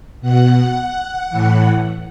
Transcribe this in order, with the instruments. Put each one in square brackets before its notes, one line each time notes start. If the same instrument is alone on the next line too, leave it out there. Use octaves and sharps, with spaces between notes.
[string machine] B2 F#5
A2 E3